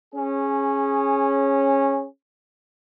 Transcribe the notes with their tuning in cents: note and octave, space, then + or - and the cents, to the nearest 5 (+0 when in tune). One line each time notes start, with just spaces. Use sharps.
C#4 -15 G#4 +0